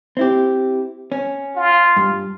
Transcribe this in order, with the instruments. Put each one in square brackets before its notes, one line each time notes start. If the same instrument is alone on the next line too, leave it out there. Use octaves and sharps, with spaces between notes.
[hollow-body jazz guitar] C4 E4 G4
C#4
[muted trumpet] F4
[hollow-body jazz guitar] G2